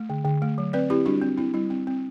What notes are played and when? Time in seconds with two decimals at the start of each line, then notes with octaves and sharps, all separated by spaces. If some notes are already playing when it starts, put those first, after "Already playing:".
Already playing: A3
0.10 D3
0.25 D3
0.42 A3
0.58 F#3
0.73 C4 B4 D5
0.90 C4 E4 G4
1.06 G3 D4 F#4
1.22 C4
1.38 C4 E4
1.54 G3 E4
1.70 C4
1.87 C4